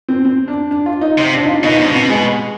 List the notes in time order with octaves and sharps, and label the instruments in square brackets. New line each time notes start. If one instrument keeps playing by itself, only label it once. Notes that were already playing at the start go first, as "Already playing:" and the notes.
[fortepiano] C4
C4
D4
D4
F4
D#4
[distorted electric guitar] C3
[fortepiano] D4
D#4
F4
[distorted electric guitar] B2 [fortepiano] D#4
[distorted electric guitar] G#2 [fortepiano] D4
[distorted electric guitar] B2
[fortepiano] C4
G#3